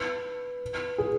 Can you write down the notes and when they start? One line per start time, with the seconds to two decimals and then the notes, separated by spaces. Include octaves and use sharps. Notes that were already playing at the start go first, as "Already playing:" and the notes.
Already playing: B4
0.98 G#4